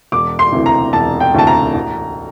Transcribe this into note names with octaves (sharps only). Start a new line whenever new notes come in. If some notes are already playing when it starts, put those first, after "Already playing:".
E1 D6
C6
D2 C3 E3
A#5
E1 A5
G5
D2 C3 E3 A5
A#5
A1